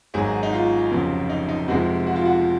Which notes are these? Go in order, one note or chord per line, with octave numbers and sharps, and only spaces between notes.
G#1 G#2 F#3 G#4
D#4
F4
F1 F2 C#3 F#3
D#4
D#4
F1 F2 C3 F3 G#3 F#4
F#4
F4
F#4